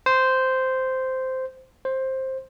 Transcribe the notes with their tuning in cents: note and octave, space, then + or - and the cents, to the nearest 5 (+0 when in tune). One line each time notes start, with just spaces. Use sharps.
C5 -10
C5 +10